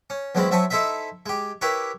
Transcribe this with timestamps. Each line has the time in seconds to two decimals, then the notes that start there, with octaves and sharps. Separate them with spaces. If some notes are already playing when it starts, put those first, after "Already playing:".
0.10 C#4
0.35 E2 F#3 G#3 C4 C#4 B5
0.51 F#2 C4 E5 A5 C#6 D#6
0.70 D#4 E4 A4 C5 D#5 E5
1.26 G#3 G4
1.61 E4 G4 A#4 B4 C#5